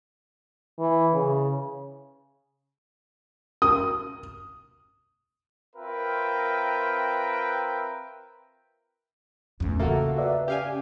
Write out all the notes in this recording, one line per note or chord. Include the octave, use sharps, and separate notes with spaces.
E3
C#3
D#6
C4 F4 A#4 B4 E5 G5
E2 A2 C#4
C#3 A#3 F4 F#4 A4 E5 F#5
B4 D5 E5
C#4 G4 F5 G#5